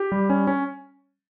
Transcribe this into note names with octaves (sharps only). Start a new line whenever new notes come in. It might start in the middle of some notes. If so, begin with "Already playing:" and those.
Already playing: G4
G3
C#4
C#4